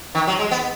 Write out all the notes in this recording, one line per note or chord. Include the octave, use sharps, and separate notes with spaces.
D#3
F#3
G#3
B3